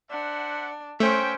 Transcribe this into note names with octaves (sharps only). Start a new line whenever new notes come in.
D4 C5 E5 F#5
A3 C#4 B4 C5 E5 G5